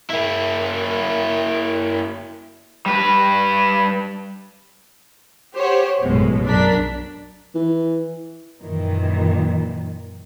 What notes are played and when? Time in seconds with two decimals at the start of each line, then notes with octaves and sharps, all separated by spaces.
0.10 A#3 E4
2.86 G3 B4
5.56 G4 C5 C#5 F#5
6.03 A1 F#2 B2 G#3
6.46 B1 F#2 D4 A#4 B6
7.55 E3
8.61 F#2 A#2 D#3 E3